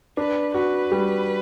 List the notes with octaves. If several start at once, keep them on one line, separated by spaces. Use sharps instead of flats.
D4 B4
F#4 B4
G3